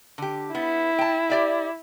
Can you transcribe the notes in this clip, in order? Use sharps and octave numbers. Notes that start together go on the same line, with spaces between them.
D3 G4
B3 E4
G5 A5
G4 D5 E5